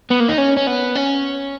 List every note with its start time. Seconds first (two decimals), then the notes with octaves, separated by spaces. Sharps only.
0.11 B3
0.20 A#3
0.29 D#4
0.38 C#4
0.57 C#4
0.67 B3
0.95 C#4